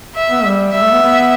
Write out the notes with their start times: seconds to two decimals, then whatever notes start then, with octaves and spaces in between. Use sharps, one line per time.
0.16 E5
0.31 B3
0.45 G3
0.73 G3 E5
0.82 A3
0.92 B3
1.02 B3